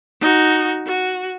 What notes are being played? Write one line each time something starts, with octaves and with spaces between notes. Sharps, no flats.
D#4 F#4
F#4